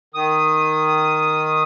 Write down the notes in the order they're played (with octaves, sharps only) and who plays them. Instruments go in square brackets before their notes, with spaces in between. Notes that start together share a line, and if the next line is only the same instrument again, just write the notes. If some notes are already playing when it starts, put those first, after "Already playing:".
[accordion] D#3 D#6